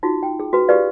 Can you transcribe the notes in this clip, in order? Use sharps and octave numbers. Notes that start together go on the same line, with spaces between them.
D#4 F4 F#4
G5
G#4
F#4 B4
F4 G4 G#4 B4 D5 F5